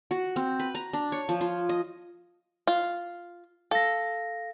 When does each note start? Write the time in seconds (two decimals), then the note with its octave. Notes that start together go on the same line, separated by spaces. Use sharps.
0.11 F#4
0.36 C4
0.60 B4
0.75 A#5
0.93 D4
1.12 C#5
1.29 F3
1.41 F4
1.69 D#5
2.67 F4
3.71 A4 F5 A#6